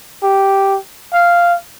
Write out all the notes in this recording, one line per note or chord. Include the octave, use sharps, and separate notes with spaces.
G4
F5